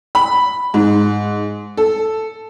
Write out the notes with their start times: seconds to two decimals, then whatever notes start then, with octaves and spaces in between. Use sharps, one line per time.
0.15 B5
0.74 G#2
1.77 A4